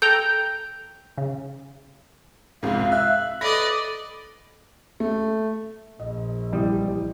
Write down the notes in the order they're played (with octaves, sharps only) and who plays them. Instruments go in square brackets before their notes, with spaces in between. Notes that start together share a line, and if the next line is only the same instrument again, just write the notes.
[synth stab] A4 G5 A#5 [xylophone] G6
[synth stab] C#3
[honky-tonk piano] C2 F2 G#2 [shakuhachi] F5
[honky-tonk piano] E5 [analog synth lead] F#6
[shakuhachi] A4 [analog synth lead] B4 [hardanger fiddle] D5 D#5 [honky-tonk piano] A#6
[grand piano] A3
[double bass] A#1 [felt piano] D#5
[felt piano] C2 E3 [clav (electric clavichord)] G3 D#5